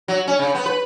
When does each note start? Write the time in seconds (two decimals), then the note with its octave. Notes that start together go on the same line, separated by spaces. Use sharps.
0.08 F#3
0.27 C#4
0.39 C#3
0.55 B3
0.66 B4